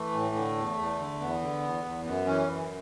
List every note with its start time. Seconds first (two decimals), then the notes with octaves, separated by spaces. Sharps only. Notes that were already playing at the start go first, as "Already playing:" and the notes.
Already playing: E3 A3
0.14 A2
0.35 D3
0.56 E2
0.78 E2
0.99 D3
1.20 E2 B3
1.41 D3
1.63 E2
1.84 E2
2.05 F#2 B3
2.26 E3 C#4
2.48 F#2 B3